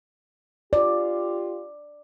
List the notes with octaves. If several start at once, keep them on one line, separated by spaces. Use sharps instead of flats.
F4 G4 D5